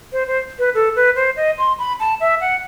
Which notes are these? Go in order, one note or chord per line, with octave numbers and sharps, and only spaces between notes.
C5
C5
B4
A4
B4
C5
D#5
C6
B5
A5
E5
F#5